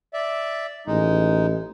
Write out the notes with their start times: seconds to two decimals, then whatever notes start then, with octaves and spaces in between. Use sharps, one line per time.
0.14 D5 E5
0.87 A1 G#3 D#4